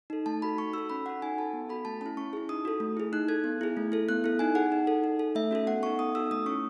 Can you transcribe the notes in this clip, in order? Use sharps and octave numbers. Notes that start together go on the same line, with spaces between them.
D#4 A4
A3 A5
D#4 F#4 A4 B5
D#4 C#6
F#4 A4 E6
C#4 B5
F#4 A4 F#5
D#4 G#5
F#4 A4 A5
B3
F#4 A4 B5
A3 A5
C#4 E4 A5
C#4 C#6
E4 G#4
D#4 D#6
F#4 A4
A3
E4 G#4
D#4 F#6
A4 G#6
B3
E4 G#4
A3
E4 A4
B3 F#6
E4 A4
D#4 G#5
G#4 F#5
D#4
A4
D#4
A4
A3 E5
C#4 F#4 A4
B3 F#5
D#4 A4 C#6
B3 D#6
D#4 F#4 A4 E6
A3 D#6
C#4 E4 C#6